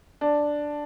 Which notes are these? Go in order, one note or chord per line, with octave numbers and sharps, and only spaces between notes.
D4